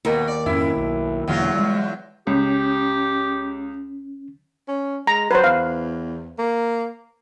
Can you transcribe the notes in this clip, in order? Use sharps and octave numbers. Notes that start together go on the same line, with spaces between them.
D#2 B2 B3 A#4
D5
F2 G#2 C#4 E4
B1
E1 E2 D3 F#3 A#3 F4
G3 G#3
C#2 C#4 G4
C#4
G#3 A#5
F#3 B4 C5
E2 F5
A#3